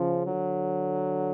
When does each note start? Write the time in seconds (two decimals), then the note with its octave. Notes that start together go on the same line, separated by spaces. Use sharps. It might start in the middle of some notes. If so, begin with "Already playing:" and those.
Already playing: C#3 F3
0.25 D3 F#3